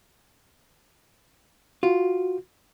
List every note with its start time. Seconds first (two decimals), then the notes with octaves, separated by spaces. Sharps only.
1.83 F4 F#4